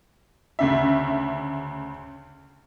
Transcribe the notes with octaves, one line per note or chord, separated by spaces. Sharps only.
D2 C#3 E5